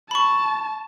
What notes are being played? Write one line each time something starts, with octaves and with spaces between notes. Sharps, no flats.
A5 B5 C#6